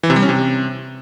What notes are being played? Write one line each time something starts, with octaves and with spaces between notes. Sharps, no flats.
E3
C3
G3
C#4
C3